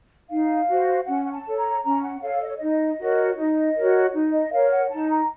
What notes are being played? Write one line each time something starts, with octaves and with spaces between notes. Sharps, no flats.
D#4 F5
F#4 C5
C#4 F#5
F#5
A5
A4 C#5
A#5
C#4 A#5
F#5
A4 C#5 F5
D#5
C#5
D#4 D#5
F#4 A#4 C#5
D#4 D#5
F#4 A#4 C#5
D#4
D#5
A#4 C#5 F5
F#5
D#4 A5
A#5